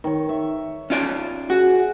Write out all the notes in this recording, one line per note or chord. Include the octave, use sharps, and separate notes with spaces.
D#3 C#5
E5
C#4 F4 D5
F#4 G#4 F#5